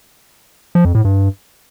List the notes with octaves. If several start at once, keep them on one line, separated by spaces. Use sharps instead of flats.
F3
F2
A2
G2